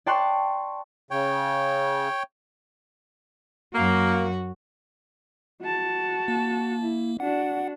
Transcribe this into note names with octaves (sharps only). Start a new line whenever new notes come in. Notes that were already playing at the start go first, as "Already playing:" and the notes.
D5 G5 A5 C6 C#6 F#6
C#3 C#5 G5
F#2 A#3 F#4
F#4 A5
A#3
E4
D4 F#4 F#5